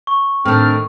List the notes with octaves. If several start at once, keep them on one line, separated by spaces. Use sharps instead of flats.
C#6
A2 D#3 C4 D4 F6